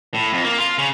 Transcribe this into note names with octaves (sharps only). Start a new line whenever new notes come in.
A2
F2
A#3
F4
C#3